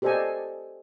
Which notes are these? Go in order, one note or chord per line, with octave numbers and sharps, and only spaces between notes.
G4 A4 C5 D5 D#5 G#5